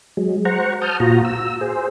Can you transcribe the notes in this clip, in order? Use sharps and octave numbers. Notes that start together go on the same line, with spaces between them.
F#3 G#3
C5 F#5 A#5 C#6
A5 D#6 F6 G6
A#2 F4 F#4 A#5
E6
G#4 C5